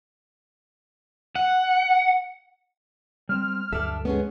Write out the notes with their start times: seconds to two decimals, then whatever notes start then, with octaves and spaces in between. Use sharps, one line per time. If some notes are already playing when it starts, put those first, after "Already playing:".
1.36 F#5
3.29 G3 C4 F6
3.73 D2 G2 F#3 D4 A4 E5
4.05 G#3 B3 C#4 G#4